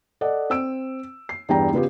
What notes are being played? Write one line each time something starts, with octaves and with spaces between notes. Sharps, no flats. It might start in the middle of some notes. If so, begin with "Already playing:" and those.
A4 D5 D#5 F#5
C4 E6 D7
C7
E2 G2 G5 A#5
C#3 B3 F4 G4